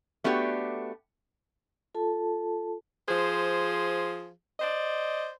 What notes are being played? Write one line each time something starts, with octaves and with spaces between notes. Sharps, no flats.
A3 B3 D4 F#4 G4
F4 A4 A5
F3 G#4 C5
C5 D5 D#5